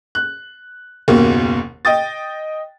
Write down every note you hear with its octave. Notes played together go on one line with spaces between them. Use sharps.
F#6
F#1 D#2 B2 A#3
D#5 G5 D#6 A6